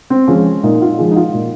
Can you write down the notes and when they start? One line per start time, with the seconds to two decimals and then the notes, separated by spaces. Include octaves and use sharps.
0.10 C4
0.28 F3 G#3 C#4
0.63 A#2 D#4
0.82 F4
0.99 F3 G#3
1.11 D#4
1.16 F4
1.34 A#2